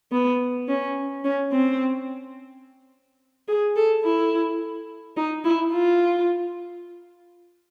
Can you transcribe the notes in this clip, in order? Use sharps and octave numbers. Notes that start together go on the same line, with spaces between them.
B3
C#4
C#4
C4
G#4
A4
E4
D#4
E4
F4